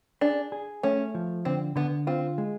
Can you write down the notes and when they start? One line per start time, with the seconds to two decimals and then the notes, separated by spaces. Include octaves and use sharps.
0.21 D4 G#4
0.52 G#4
0.83 A3 C#4
1.15 F3
1.45 D3 C4
1.76 D3 B3
2.07 C4 F4
2.38 G#3